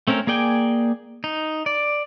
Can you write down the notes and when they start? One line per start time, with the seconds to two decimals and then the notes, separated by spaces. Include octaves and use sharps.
0.08 A3 C4 C#4 A#4
0.27 A#3 G#4 D5 G5 G#5
1.24 D#4
1.66 D5